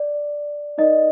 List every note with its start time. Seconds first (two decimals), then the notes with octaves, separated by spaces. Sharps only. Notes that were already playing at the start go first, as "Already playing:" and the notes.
Already playing: D5
0.78 D#4 A#4 D5 D#5